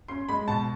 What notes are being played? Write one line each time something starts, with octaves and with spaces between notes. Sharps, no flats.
C#4 C6
G#3 B5
B2 A5